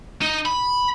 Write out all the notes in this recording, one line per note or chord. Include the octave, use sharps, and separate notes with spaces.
D#4
B5